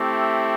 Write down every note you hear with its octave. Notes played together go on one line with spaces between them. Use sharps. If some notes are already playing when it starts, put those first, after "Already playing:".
Already playing: A3 C4 E4 G4